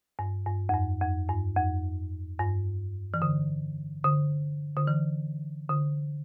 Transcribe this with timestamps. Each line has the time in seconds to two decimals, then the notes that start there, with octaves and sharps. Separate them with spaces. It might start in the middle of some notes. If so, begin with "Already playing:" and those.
0.19 G2
0.46 G2
0.69 F2
0.74 G2
1.02 F2
1.29 G2
1.57 F2
2.39 G2
3.14 E3
3.22 D3
4.04 D3
4.77 D3
4.87 E3
5.70 D3